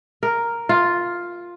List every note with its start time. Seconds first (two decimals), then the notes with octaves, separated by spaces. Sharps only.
0.23 A#4
0.69 F4